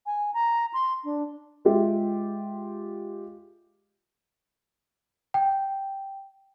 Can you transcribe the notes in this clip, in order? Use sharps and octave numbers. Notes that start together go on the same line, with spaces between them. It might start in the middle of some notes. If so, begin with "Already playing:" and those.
G#5
A#5
C6
D4
G#3 F4 G4 E5
G5